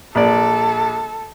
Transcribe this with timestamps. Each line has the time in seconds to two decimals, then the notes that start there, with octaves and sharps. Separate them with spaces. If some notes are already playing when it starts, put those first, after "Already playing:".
0.15 A#1 A#3 A4 D5